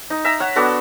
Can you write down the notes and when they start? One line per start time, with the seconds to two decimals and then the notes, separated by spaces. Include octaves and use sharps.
0.10 D#4
0.25 E5 A#5
0.40 C#5 F#5
0.56 B3 D4 F#4 A4